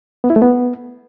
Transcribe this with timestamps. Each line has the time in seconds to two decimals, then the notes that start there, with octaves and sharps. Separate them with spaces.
0.24 B3
0.30 E4
0.36 A3
0.42 B3